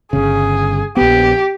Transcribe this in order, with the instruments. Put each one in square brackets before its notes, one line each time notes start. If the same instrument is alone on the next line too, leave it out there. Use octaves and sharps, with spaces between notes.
[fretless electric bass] G1 C#3 [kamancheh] G#4
[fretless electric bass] A#1 B3 [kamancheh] G4